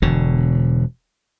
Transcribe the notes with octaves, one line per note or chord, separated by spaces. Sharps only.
E1 B2 D3